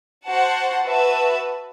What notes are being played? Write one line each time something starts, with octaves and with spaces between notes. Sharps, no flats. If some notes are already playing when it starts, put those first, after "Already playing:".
F#4 C5 F#5 A5
F#4 B4 E5 A5